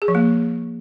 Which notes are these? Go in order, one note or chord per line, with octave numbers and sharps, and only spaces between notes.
G#4
F3
A#3